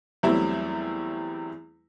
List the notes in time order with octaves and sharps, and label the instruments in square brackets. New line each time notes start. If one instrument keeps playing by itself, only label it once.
[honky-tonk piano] E2 F#3 G3 A3 C4 E4